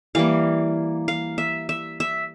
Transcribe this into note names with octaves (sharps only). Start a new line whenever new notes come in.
E3 G3 A#3 F5
F5
E5
E5
E5